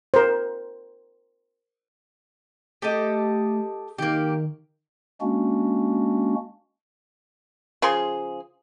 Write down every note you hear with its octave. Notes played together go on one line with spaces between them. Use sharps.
A#4 C5
A3 G4 A4 D#5
D#3 A#3 G4
G#3 A#3 C#4 D4 F#4
C#3 F3 G#4 C6